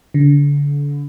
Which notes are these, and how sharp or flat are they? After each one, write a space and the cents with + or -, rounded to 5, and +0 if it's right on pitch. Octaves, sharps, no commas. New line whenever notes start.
D3 -35